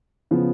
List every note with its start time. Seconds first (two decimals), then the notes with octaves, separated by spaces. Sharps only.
0.31 C#3 F3 B3